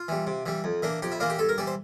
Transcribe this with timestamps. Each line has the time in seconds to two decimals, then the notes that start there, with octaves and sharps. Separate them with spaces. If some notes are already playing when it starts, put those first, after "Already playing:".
Already playing: F4
0.08 E3 G3
0.27 C3
0.46 E3 G3
0.64 F2
0.82 E3 A#3 D4
1.02 F2 G4
1.12 E4
1.20 E3 A#3 D4 F4
1.30 G4
1.39 G2 A4
1.49 A#4
1.58 E3 G3 D5
1.67 C5